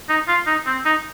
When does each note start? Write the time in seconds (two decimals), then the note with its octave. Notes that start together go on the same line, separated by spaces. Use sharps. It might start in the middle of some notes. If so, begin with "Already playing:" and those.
0.09 D#4
0.28 F4
0.47 D#4
0.66 C4
0.85 D#4